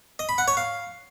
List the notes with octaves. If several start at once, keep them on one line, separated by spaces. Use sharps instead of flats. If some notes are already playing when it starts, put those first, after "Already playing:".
D#5
B5
F#5
C#5
F5